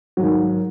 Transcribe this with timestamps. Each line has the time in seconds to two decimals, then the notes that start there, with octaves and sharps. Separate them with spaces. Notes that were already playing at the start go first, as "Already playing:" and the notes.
0.17 F#3
0.20 G#2
0.22 D#3